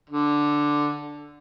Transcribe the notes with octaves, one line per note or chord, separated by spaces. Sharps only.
D3